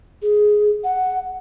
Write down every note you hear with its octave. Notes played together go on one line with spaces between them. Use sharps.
G#4
F#5